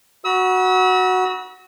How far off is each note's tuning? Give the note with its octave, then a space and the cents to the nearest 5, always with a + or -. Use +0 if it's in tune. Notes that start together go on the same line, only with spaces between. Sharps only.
F#4 +0 B5 -40 E6 -35